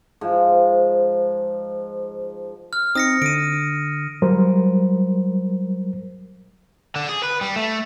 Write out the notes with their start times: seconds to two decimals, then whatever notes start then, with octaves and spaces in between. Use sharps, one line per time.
0.21 G#2 F3
2.73 F6
2.95 C4 D#4 D#6 A#6 C#7
3.22 D3 D7 D#7
4.22 F#3 G3 A#4 C5
6.96 D3
7.09 G#4
7.23 B4
7.41 G3
7.56 A3